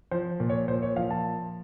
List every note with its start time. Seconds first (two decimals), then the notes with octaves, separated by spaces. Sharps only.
0.11 F3 C5
0.40 A#2
0.49 C#5
0.68 A#2 C5
0.82 C#5
0.96 F3 F5
1.11 A5